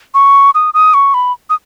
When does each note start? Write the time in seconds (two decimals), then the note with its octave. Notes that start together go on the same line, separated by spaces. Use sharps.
0.14 C#6
0.55 D#6
0.74 D#6
0.94 C#6
1.14 B5
1.50 D#6